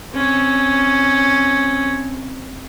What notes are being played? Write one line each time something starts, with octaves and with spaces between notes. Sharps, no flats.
C4 C#4